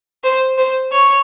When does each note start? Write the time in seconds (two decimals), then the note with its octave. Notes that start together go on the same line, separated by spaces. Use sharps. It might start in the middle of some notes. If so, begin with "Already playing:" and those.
0.24 C5
0.58 C5
0.92 C#5